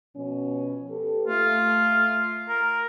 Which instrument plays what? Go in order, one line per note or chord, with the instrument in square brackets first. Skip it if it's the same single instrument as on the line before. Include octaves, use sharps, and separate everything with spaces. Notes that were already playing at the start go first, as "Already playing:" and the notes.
[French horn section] B2 F3 C#4
G4 A4 B4
[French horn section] A3 [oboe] F4
[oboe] A#4